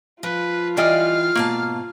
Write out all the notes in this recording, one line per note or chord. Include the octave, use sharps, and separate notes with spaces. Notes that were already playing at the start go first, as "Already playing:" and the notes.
F3 F4 B4
D2 E3 G3 D5 D#5 F5 G5 F6
G#2 B2 A#3 A5